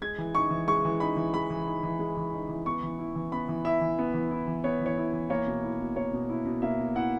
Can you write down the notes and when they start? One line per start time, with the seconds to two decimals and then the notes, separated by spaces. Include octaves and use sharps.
0.01 G#3 G#6
0.18 E3
0.35 D#4 C#6
0.51 E3
0.68 G#3 C#6
0.85 E3
1.00 D#4 B5
1.17 E3
1.34 G#3 B5
1.50 E3
1.66 D#4
1.83 E3
1.99 G#3
2.17 E3
2.33 D#4
2.49 E3
2.66 B3 C#6
2.83 E3
2.99 E4
3.15 E3
3.32 B3 B5
3.49 E3
3.65 E4 E5
3.81 E3
3.99 B3
4.14 E3
4.31 E4
4.47 E3
4.64 B3 C#5
4.81 E3
4.86 C#5
4.97 E4
5.13 E3
5.30 A#3 C#5
5.47 B2
5.64 E4
5.80 B2
5.96 A#3 C#5
6.13 B2
6.30 E4
6.45 B2
6.62 A#3 E5
6.79 B2
6.95 E4 F#5